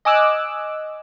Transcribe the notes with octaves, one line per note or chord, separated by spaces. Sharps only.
D#5 G#5 D6 E6 F#6